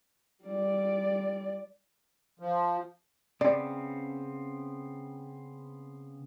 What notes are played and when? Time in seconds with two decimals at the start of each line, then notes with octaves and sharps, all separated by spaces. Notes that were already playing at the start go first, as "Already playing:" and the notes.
0.44 G3 D5
2.40 F3
3.41 C#3 B3 C4 D5